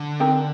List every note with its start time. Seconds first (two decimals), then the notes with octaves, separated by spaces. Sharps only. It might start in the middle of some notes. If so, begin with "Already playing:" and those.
Already playing: D3
0.20 C4 D#4 G4 A#4